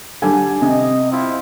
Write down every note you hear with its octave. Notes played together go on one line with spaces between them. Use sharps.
D3 G3 A4 G#5
C3 D#5
C4 E4 F4